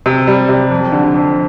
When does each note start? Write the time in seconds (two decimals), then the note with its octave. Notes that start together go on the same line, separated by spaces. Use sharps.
0.06 C3
0.27 G3
0.49 C3
0.71 F2
0.92 D3
1.14 F2